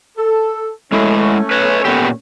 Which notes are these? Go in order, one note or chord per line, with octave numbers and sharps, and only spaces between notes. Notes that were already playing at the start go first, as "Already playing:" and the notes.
A4
G#3 A3 C#4 E4
B4 C#5
A#2 B3 G4